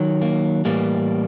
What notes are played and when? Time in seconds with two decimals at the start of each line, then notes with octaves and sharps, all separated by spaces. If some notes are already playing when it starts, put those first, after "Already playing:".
Already playing: D#3 F#3
0.22 A#3
0.65 A2 E3 G3 A#3